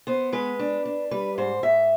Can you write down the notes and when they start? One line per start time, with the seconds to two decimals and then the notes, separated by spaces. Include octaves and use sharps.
0.07 B3 C5
0.32 G#3 B4
0.59 D4
0.85 D4
1.11 G3 B4
1.38 G#2 C5
1.63 G#2 E5